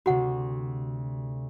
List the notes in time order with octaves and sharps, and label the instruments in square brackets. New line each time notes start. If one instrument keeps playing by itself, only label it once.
[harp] D2 C3 [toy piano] F#4 F#5